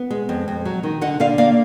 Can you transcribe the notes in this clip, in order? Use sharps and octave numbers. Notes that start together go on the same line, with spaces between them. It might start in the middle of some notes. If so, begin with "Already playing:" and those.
Already playing: B3
G#3
F2
F2
F#3
D#3
D3 D#5 F#5
D3 D5 F5
A#3 D5 F5